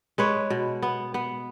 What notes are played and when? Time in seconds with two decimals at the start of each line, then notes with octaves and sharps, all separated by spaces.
0.18 G#3 B4 C#5
0.50 B2
0.82 B3
1.14 B3